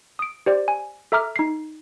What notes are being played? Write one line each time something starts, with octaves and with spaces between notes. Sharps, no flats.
D#6 D7
G4 C5 D5
G#5
A4 E5 A#5 D6 F6
D#4 C7